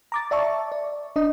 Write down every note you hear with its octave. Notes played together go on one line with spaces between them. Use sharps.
A#5 D6 A6
D5 E5 A5 C#6
D5
D4 D#5